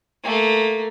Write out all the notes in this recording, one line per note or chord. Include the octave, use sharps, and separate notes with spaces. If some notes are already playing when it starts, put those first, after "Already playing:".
A3 A#3